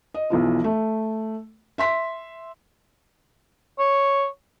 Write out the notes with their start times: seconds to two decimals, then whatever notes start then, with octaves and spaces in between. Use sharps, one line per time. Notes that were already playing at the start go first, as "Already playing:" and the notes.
0.14 D#5
0.30 B1 E3 F3
0.64 A3
1.78 E5 C6 B6
3.79 C#5